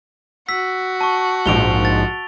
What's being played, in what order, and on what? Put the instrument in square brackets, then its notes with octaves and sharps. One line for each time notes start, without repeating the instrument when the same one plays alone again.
[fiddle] F#4 [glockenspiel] E6 B6
[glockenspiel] A5 C#6
[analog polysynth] A#1 G#2 F3 [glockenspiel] D7 F7 G7
[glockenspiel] A6